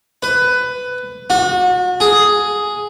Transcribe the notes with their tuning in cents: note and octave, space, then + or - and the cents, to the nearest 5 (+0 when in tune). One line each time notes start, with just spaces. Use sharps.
B4 +15
F#4 -35
G#4 +5